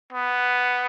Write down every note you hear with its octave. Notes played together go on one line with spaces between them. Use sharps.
B3